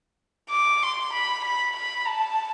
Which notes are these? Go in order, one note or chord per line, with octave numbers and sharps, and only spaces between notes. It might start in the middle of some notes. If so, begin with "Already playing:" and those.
D6
C6
B5
B5
B5
A5